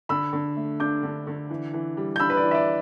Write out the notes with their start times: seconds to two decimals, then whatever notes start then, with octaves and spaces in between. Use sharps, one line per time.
0.09 D3 B5 E6
0.33 D3
0.57 A3
0.80 D4 D6 G6
1.03 D3
1.27 D3
1.50 E3
1.73 E3
1.97 G3
2.16 G6
2.20 D4 B5 E6
2.30 B4
2.37 D5
2.43 E3
2.51 E5
2.55 D5